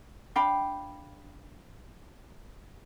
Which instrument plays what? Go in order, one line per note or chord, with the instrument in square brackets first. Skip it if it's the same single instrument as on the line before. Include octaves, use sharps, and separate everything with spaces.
[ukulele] D4 F5 G5 B5